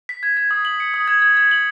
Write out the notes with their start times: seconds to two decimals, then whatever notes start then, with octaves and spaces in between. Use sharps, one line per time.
0.09 B6
0.23 G#6
0.37 G#6
0.51 D#6
0.65 F#7
0.80 C#7
0.94 D#6
1.08 G#6
1.22 G#6
1.37 G#6
1.51 F#7